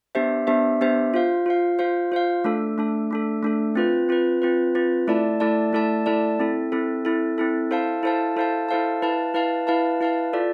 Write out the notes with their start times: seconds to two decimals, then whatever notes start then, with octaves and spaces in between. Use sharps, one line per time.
0.15 B3 D4 G4 C5 E5
0.47 B3 D4 G4 C5 E5
0.81 B3 D4 G4 C5 E5
1.14 F4 C5 F5
1.46 F4 C5 F5
1.79 F4 C5 F5
2.12 F4 C5 F5
2.44 A3 D4 A4
2.78 A3 D4 A4
3.11 A3 D4 A4
3.43 A3 D4 A4
3.76 C4 F4 B4
4.09 C4 F4 B4
4.42 C4 F4 B4
4.75 C4 F4 B4
5.07 A3 E4 A4 D5 A5
5.40 A3 E4 A4 D5 A5
5.73 A3 E4 A4 D5 A5
6.06 A3 E4 A4 D5 A5
6.39 C4 E4 A4
6.72 C4 E4 A4
7.05 C4 E4 A4
7.38 C4 E4 A4
7.71 E4 A4 C5 F5 A5
8.03 E4 A4 C5 F5 A5
8.36 E4 A4 C5 F5 A5
8.69 E4 A4 C5 F5 A5
9.02 E4 B4 F5 A5
9.34 E4 B4 F5 A5
9.67 E4 B4 F5 A5
10.01 E4 B4 F5 A5
10.33 F4 A4 D5